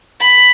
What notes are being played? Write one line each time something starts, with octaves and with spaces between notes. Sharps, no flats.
B5